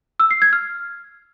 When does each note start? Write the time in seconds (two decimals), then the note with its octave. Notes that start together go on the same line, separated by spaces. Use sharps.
0.20 E6
0.31 C7
0.42 G#6
0.53 F6